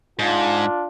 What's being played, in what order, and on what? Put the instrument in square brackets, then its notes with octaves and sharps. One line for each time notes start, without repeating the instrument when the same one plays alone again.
[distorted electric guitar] G#2 [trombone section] D4 F4